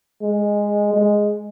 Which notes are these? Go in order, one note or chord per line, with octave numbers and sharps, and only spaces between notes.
G#3
G#3